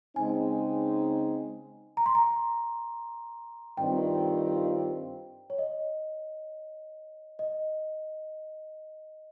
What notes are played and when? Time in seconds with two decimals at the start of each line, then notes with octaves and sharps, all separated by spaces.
0.16 C#3 G#3 C4 D#4 G#5
1.97 A#5
2.06 C6
2.15 A#5
3.77 G2 D#3 G3 C4 F4 G5
5.50 C#5
5.59 D#5
7.39 D#5